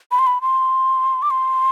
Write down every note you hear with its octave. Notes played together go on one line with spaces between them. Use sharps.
B5
C6
B5
C6
D6
C6